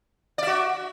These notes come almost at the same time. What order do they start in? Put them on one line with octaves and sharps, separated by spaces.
D5 E5 F#4